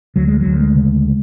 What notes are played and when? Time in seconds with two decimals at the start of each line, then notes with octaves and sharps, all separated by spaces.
0.16 D2 F#3
0.28 G#3
0.41 F#3
0.46 D2
0.60 G#3
0.76 C#3